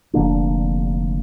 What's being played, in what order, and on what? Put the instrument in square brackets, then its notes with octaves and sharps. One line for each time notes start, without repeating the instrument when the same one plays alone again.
[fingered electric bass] F1 D3 A#3 D4